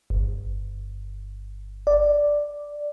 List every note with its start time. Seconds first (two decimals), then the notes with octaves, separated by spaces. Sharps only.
0.10 G1
1.87 D5